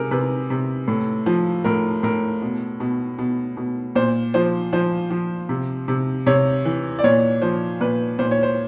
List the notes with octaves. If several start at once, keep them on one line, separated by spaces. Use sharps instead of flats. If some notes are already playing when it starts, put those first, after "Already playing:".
Already playing: C3 G#4 A#4
C3 B4
C3
A2
F3
A2 A#4
A2 A#4
B2
B2
B2
B2
A#2 C5
F3 C5
F3 C5
F3
C3
C3
C3 C#5
E3
D5
A#2 C#5
F3 C5
A#2 B4
A#2 C5
C#5
C5